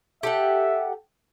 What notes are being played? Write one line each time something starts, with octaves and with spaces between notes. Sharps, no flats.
G4 A4 E5 F#5